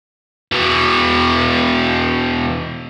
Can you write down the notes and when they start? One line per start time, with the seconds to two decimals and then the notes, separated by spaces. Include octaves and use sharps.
0.52 B2 E3